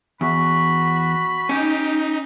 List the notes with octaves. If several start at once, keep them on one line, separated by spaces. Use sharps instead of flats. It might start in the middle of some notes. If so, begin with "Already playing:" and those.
E2 F#4 B5
C#4 D#4 G4